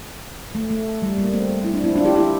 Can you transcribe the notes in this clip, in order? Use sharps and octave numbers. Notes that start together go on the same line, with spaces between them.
A3
A3
G3
G3 A#3
A3 C4
E4
D4
C4 E4
D4 F4
E4 G4
E4 G4